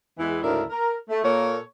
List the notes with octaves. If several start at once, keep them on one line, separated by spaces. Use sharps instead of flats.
E2 E3 G#3 B3 E4
D2 G#2 C#3 D4 E4 A#4
A#4
A3
A#2 A#3 A4 C#5